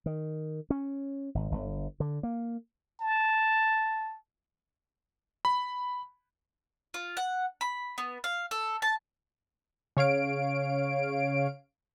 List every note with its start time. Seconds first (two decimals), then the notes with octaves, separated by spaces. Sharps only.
0.06 D#3
0.70 C#4
1.35 G#1
1.51 G1
2.00 D3
2.23 A#3
3.01 A5
5.45 B5
6.94 F4
7.17 F#5
7.61 B5
7.98 B3
8.24 F5
8.51 A4
8.82 A5
9.97 C#3 C#5 F5 D7